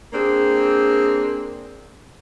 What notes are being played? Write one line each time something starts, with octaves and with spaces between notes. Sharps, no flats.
A#3 C4 D4 G#4